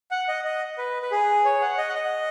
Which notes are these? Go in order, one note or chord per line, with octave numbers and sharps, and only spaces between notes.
F#5
D#5
D#5
B4
B4
G#4
C#5
F#5
D#5
F#5
D#5